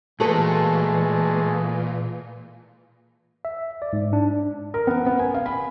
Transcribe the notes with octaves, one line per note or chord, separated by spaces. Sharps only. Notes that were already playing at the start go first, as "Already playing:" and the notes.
A#2 E3 G#3 A3 F#4 A4 B4
E5
D5
G#2
D4
A#4
B3
B3
G#5
F5
B5